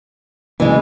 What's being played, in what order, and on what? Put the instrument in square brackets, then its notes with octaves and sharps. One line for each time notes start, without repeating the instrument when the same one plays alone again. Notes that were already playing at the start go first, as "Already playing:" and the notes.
[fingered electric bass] C#3 A#3 D4 [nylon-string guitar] E3 G#3